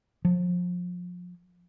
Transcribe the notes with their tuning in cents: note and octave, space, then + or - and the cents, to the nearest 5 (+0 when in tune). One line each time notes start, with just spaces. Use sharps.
F3 +30